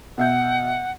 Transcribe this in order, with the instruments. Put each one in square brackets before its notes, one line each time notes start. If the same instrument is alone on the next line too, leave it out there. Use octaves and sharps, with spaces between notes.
[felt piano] B2 E5 G6 [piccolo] F#5